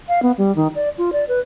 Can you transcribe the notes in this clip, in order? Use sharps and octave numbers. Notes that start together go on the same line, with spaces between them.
F5
B3
G3
D#3
D5
F4
D5
B4